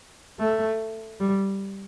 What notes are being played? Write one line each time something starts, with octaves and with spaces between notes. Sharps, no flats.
A3
G3